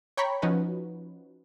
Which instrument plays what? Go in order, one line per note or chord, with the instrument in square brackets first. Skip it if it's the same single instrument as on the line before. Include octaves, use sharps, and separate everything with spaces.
[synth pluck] C#5 G5 A#5 B5 C#6 B6
F3 C#4 D#4 F#4 B4